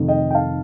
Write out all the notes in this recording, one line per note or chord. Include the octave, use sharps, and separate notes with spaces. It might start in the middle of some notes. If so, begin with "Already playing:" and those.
Already playing: F1 F2 D#3
D#5 G5
G5
F5 A5